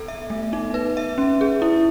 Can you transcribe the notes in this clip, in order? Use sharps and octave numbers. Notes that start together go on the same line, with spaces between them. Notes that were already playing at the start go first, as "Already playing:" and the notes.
Already playing: B3 A4
E5
A3
D#4
B4
E5
C#4
G#4
E4